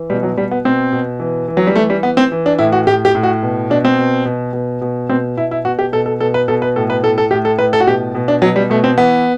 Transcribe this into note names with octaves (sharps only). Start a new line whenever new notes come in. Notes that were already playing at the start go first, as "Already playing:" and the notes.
Already playing: E3
B2 G3
F#3
B2 G3
B3
B2 C4
B2
E3
E3
F#3
G3
E3 A3
G3
E3 B3
C4
E3
D4
A2 E4
F#4
A2 G4
G4
A2
F#4
B2
B2 D4
C4
B2
B2
B2
B2
B2 C4
B2 E4
E4
B2 F#4
G4
B2 A4
A4
B2 A4
B4
B2 A4
B4
A2 A4
B4
A2 A4
A4
A2 G4
A4
A2 B4
A4
F#4
B2 G4
B2
D4
B2 F#3
G3
B2 A3
C4
E3 B3